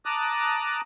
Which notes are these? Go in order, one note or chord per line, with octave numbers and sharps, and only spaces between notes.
A5 A#5 D6 D#6 F#6